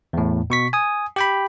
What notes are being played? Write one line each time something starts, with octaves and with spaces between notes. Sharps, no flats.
E2 A2
B2 C#6 B6
G#5 D#6
G4 G5 B5